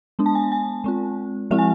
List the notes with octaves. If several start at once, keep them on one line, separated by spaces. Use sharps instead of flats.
G#3 B3 D4
A5
G#5
G#5
G#3 C4 F4
F3 G#3 C4 E4 E5
G#5